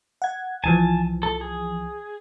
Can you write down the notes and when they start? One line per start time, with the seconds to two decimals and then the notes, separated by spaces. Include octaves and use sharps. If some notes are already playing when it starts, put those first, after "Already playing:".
0.22 F#5 G#6
0.64 C2 E3 F3 G#5 A5
1.23 A4
1.41 G#4